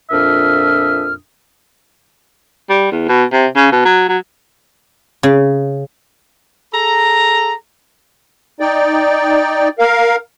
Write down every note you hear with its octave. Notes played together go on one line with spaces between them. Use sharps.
F2 A#2 D4 E5 D#6 F6
G3
E2
B2
C3
C#3
B2
F#3
F#3
C#3
G#4 A4 A#5
D#4 D5 G5
A#4 F5